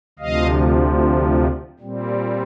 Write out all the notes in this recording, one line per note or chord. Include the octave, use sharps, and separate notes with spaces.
D2 C3 F3 D#5 F5
A#2 G3 C4